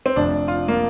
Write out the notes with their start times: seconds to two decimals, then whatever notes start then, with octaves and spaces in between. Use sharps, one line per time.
0.06 C4
0.16 F1 F2 C3 F3 D4
0.48 F4
0.68 A#3